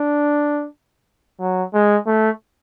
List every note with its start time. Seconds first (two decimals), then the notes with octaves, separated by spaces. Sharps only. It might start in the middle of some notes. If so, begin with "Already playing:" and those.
Already playing: D4
1.40 F#3
1.74 G#3
2.07 A3